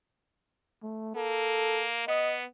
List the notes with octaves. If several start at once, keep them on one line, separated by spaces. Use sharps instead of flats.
A3
A#3 A4
B3 D#5